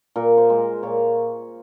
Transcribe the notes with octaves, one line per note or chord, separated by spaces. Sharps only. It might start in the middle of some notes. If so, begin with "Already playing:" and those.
A#2 A#4
C5
G#3
A#2 C#5